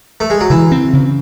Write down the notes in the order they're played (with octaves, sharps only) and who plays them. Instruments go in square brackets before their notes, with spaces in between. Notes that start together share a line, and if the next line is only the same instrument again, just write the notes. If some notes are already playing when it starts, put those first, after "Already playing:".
[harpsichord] A3
G#3
F#3
[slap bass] C#3 [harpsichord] E3
[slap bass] C4
C#3